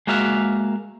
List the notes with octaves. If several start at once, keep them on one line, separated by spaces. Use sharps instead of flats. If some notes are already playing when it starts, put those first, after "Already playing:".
G#3 A#3 F#4 E5 F5